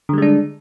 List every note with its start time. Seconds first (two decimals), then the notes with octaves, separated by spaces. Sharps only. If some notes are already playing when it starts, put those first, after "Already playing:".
0.09 D3
0.13 G3
0.18 G#3
0.22 D4